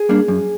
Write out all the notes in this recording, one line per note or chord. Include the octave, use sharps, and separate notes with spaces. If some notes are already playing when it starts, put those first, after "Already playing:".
Already playing: G#4
G3 A#3 D4
F#2